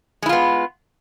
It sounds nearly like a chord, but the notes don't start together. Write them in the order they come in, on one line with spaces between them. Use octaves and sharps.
G#3 E4 F4 B3